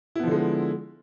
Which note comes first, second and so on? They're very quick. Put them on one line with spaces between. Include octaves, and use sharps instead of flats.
E4 B3 F3 D3 G#3